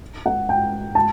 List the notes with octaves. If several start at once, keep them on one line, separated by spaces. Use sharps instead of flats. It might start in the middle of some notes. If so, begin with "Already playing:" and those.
F#5
G5
A5